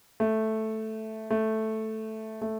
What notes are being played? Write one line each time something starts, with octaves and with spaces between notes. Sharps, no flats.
A3
A3
A3